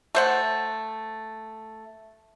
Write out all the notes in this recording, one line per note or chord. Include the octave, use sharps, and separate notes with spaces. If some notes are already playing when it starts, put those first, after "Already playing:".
A3 C5 F#5